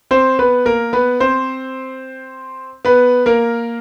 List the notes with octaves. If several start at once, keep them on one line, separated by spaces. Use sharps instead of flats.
C4 C5
B3 B4
A#3 A#4
B3 B4
C4 C5
B3 B4
A#3 A#4